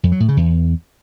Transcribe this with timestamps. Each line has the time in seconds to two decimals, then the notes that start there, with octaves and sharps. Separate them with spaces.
0.03 F2
0.12 F#3
0.20 A2
0.28 C#3
0.37 E2